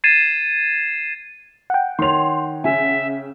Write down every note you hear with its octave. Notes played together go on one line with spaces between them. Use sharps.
G#6 A6 C7 D#7 E7
F#5 G5
D#3 C#5 C6 F7
C#3 E5 G#5